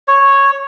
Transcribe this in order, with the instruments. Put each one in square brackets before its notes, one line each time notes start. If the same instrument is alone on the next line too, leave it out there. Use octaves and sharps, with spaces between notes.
[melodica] C#5